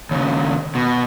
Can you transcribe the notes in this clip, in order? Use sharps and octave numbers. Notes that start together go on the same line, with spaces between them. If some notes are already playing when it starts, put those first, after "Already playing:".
D#2 C#3
B2